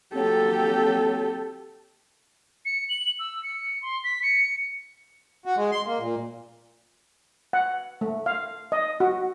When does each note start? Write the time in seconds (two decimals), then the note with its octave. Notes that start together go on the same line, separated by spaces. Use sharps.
0.14 F#3 A#3 C4 G4 A4
2.65 C#7
2.89 F#7
3.19 E6
3.43 C#7
3.82 C6
4.04 B6
4.23 C#7
5.46 F#4
5.57 G#3
5.72 C6
5.86 A#3
5.99 A#2
7.53 F#5
8.01 A3
8.26 F5
8.72 D#5
9.00 F#4